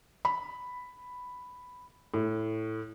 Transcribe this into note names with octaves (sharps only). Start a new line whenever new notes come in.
B5
A2